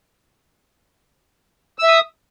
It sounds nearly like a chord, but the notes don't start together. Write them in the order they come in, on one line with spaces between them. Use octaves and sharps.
E6 E5 D#6